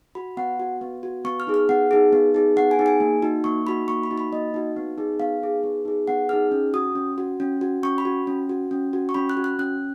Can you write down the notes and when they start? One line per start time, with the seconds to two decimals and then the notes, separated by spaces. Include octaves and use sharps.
0.15 F#4 B5
0.37 B3 F#5
0.60 F#4
0.81 B3
1.03 F#4
1.25 B3 C#6
1.40 F6
1.47 D#4 G#4
1.54 F6
1.69 B3 F#5
1.91 D#4 G#4
2.13 B3
2.34 D#4 G#4
2.56 B3 F#5
2.71 G#5
2.79 D#4 G#4
2.86 G#5
3.00 A#3
3.22 D#4 F#4
3.44 A#3 C#6
3.66 D#4 F#4 B5
3.88 A#3 C#6
4.03 B5
4.11 D#4 F#4
4.18 B5
4.32 A#3 D#5
4.54 D#4 F#4
4.76 B3
4.98 D#4 G#4
5.20 B3 F5
5.42 D#4 G#4
5.63 B3
5.85 D#4 G#4
6.08 B3 F#5
6.29 D#4 G#4 F6
6.52 C#4
6.74 F#4 D#6
6.95 C#4
7.18 F#4
7.40 C#4
7.61 F#4
7.83 C#4 C#6
7.98 B5
8.05 F#4
8.27 C#4
8.49 F#4
8.71 C#4
8.93 F#4
9.09 C#6
9.14 C#4 B5
9.30 F#6
9.37 F#4
9.44 F#6
9.59 C#4 F#6